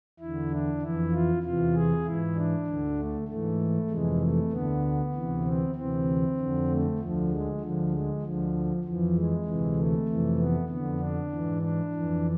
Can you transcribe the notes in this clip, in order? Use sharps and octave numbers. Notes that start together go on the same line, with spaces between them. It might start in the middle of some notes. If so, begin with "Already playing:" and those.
E2 D3 E4
D4
F2 E3 E4
F4
E2 C3 E3 F4
G#4
G#2 E3 E4
D4
D2 D3
A3
G#2 E3 A3
F2 C3 E3 G#3
A3
D2 D3 B3
D2 C3 E3
C4
D2 C3 E3 C4
F2 D3
A3
D2 D3 F3
G#3
D2 D3 F3
G#3
D2 D3 F3
F2 E3 F3
G#3
D2 C3 E3
A3
F2 C3 E3
B3
F2 D3 B3
D4
G#2 E3
D4
F2 E3